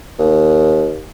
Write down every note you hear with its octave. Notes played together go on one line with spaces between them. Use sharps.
D#2